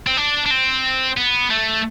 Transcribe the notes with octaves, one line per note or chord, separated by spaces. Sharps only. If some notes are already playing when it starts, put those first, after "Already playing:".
C4
D4
D4
C4
B3
A3